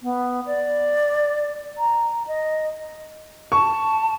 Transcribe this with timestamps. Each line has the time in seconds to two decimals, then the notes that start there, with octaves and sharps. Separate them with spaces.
0.02 B3
0.46 D5
1.78 A#5
2.27 D#5
3.52 A5 C#6